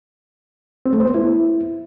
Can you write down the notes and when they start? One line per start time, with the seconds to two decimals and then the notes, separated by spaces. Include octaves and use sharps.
0.86 C4
0.93 A3
1.00 C5
1.07 B3
1.14 E4